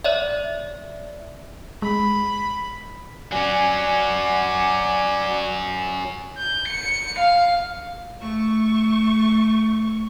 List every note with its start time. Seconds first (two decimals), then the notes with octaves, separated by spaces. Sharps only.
0.04 C#5 D5 E5
1.82 G#3 B5
3.33 F#3 C#4 D5 F#5 G#5
6.38 G6
6.68 C#7
7.18 F5
8.20 A3 C#6